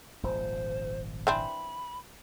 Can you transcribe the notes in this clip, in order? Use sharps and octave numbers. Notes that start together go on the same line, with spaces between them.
D#1 G#1 F3 C5
E3 C4 D4 B5